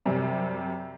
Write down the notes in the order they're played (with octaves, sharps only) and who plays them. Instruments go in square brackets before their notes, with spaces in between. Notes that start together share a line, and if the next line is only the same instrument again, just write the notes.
[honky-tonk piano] F#2 C3 G3